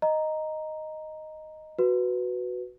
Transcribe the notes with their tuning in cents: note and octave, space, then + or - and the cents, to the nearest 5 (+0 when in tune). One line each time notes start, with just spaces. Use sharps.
D#5 +0 A#5 +0
F#4 +0 B4 +0